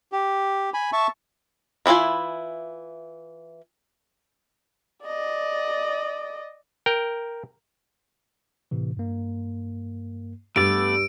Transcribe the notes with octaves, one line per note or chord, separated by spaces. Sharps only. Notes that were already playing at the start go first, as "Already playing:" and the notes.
G4
G#5 B5
E5 A5 C#6
D#3 E3 E4 F4 G#5
D5 D#5
A#4 G5
A2 C3 E3
G2 A#3
G2 A3 B3 D5 E6 D7